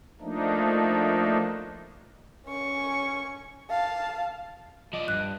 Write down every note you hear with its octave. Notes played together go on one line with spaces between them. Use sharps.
F3 A3 A#3 D4 D#4
C#4 C#6
F5 A5
F3 D5 D#5
G2 F#6